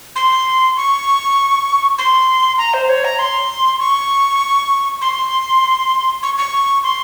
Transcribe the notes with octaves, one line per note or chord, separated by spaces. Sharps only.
C6
C#6
C6
A#5
C5
C#5
A#5
C6
C#6
C6
C#6
C#6
C6